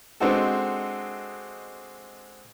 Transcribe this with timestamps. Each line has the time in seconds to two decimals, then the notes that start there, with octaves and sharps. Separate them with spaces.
0.20 G#3 C4 D4 D#4 F#4 A4